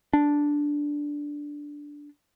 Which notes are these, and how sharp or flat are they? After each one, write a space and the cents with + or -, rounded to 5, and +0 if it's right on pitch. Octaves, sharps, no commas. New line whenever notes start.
D4 -5